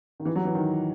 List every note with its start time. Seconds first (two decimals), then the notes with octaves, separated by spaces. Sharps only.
0.20 D#3
0.25 E3
0.35 F#3
0.45 E3
0.55 D#3